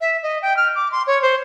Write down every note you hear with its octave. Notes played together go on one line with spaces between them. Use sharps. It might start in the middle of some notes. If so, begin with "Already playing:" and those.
E5
D#5
G5
F6
D6
C6
C#5
C5